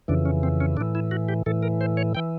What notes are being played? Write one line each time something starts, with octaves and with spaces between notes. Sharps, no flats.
F2 C#3 E3 D4
C#4
C4
C#4
A2 E3 D4
E4
F#4
G4
A2 E3 A4
A#4
C5
C#5
E3 G5